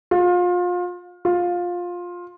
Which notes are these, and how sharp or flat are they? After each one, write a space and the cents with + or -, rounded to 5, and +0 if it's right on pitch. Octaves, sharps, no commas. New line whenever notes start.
F4 +30
F4 +15